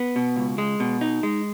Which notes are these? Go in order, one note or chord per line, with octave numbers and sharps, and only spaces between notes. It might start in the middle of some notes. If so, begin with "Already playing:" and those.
Already playing: B3
B2
C#2
G#3
B2
D#4
G#3